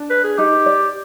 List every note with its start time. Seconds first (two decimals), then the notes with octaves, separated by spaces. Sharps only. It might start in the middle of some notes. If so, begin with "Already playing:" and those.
Already playing: D4
0.10 B4
0.24 G#4
0.38 D#4 G4
0.66 D5